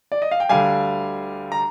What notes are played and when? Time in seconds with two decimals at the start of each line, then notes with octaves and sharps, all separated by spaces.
0.12 D5
0.22 D#5
0.31 F5
0.40 G5
0.49 D2 D3 G3 F5 G#5
1.52 A#5